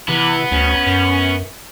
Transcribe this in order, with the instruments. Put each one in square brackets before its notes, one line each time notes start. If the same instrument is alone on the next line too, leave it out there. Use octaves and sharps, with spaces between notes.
[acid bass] C3 [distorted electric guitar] E3 [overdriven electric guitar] B3
[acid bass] D2 [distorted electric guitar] C#4
[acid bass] F#2